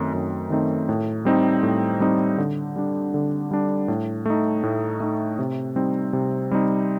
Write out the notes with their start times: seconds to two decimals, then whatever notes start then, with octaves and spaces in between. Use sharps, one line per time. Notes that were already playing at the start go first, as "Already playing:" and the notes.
Already playing: F#2 D#3 A3 C4 D#4
0.13 F#2
0.50 D#3 A3 C4 D#4
0.89 A2
1.25 G3 C4 D#4
1.63 A2
2.00 G3 C4 D#4
2.38 D3
2.76 G3 D4
3.14 D3
3.51 G3 D4
3.88 A2
4.26 A3 D#4
4.63 A2
5.00 A3 D#4
5.39 C3
5.76 G3 C4 D#4
6.13 C3
6.51 G3 C4 D#4